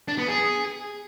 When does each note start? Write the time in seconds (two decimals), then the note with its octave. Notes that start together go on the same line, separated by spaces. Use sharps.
0.08 D4
0.18 B3
0.28 G#4